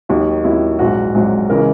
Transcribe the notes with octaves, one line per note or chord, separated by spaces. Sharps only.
D#2 D#3 F#3 D#4
D#2 D#3 F#3 E4
A#1 G#2 F#3 F#4
A#1 G#2 F#3
C#3 E3 G#3 A#4